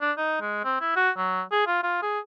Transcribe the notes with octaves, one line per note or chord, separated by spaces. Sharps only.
D4
D#4
G#3
C4
E4
F#4
F#3
G#4
F4
F4
G#4